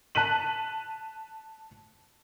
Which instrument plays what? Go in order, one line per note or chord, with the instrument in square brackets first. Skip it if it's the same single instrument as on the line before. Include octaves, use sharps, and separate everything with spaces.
[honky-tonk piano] A5 F#6 B6 D#7 F#7